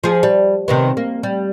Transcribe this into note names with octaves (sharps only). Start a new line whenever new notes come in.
F3 G#4
G3
C3 D#3 B3
A#3
G3